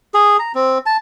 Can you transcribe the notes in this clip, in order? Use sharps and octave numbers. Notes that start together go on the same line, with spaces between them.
G#4
A#5
C4
A5